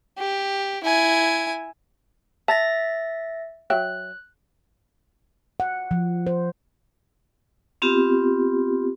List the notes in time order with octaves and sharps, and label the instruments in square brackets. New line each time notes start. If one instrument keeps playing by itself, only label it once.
[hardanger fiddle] G4
E4 G#5
[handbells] E5 A6 A#6 [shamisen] A5
[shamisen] F#3 E5 G5 [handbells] F#6
[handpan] F#5
F3
C5
[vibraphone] B3 C4 F4 G4